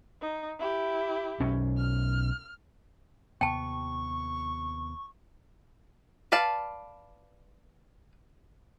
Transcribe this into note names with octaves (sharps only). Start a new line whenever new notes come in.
D#4
E4 G4
B1 C#4
F6
D#2 C3 B3 G5 A5 C#6
B4 D5 F5 A5